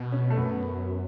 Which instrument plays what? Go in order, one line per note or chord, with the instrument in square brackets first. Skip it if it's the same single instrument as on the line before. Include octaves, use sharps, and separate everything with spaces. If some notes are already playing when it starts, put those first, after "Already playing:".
Already playing: [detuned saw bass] B2
[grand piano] C#4
A3
[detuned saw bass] F#2 [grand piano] B3